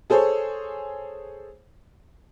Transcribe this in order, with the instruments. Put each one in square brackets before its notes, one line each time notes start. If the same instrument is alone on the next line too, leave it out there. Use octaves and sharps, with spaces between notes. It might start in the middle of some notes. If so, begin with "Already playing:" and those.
[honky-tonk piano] G#4 A4 C5 C#5